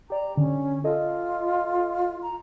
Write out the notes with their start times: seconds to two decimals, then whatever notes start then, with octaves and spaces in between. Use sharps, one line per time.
0.10 G4 D5 A#5
0.37 D3 C#4
0.84 F4 A4 D#5
2.22 A#5